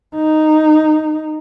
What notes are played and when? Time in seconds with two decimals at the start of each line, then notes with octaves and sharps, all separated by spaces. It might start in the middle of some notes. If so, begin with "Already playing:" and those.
0.16 D#4